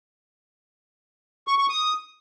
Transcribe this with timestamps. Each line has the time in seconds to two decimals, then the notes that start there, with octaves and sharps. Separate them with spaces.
1.48 C#6
1.58 C#6
1.69 D#6